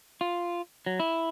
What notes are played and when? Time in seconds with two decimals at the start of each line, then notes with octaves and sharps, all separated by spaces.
0.21 F4
0.86 F#3
1.00 E4